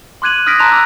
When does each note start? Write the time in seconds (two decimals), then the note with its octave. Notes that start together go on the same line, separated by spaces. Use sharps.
0.22 C6 D6 F#6 G#6 D#7 F#7
0.46 D#6 F6 F#6 A#6 B6 D7
0.59 A5 A#5 C6 F#6 F7
0.72 D6 E6